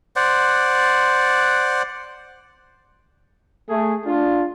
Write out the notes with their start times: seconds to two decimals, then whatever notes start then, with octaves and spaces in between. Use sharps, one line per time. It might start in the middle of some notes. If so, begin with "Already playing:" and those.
0.16 C5 D5 F#5
3.69 A3 G#4
4.06 D4 F4